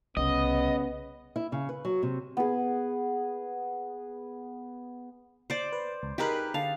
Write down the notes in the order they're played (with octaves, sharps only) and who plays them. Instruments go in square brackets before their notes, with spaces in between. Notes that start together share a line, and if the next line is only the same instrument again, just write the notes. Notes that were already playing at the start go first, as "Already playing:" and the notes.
[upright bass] C2 [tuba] C#3 [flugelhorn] B3 [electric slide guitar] D#5
[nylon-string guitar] E4
C#3
B4
F#3
C3
[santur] B3 G#4
[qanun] C5 D5
[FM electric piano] B4
C#2
[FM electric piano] D#4 A#4 F#6 [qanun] G4 G#4 B4
[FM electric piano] D3 A5 [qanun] F5